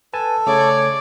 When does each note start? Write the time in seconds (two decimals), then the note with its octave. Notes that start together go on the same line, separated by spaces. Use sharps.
0.13 A4 B4 G#5 A5
0.47 C#3 A3 G#4 C#5 D5